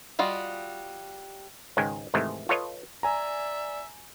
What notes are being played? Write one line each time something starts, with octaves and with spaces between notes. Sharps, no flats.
G3 F4 F#4 D#5
C#2 G#2 D#3 G#3 G5 G#5
G#2 C3 D#3 E3 G#3 A3
F4 A4 B4 C#5 D#5
D5 E5 G#5 A#5